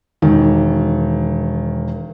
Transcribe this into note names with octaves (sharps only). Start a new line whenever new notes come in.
E1 D#3